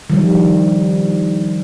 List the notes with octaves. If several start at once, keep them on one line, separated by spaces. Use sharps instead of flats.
D#3 F3 G3